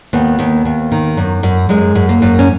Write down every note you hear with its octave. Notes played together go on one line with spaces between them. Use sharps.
D#2 B3
D#2
D#2
D#3
F#2
F#2
F#2 G#3
F#2
A#3
F#2
C#4